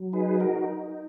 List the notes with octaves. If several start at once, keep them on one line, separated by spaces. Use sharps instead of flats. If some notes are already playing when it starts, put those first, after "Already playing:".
Already playing: F#3
D#4 G#4 B4
F#4 A#4
D#4